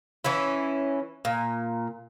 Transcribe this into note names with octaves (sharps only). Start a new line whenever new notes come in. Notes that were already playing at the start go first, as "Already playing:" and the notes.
E3 C#4 E4
A#2